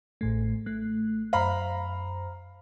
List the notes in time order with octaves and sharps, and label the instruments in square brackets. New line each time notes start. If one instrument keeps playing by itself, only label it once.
[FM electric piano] A1 A2 A3
A3 F#6
[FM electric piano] F#2 C5 [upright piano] F5 A#5 B5